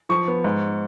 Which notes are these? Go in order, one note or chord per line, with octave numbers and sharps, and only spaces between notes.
F3 C#6
B3
G#2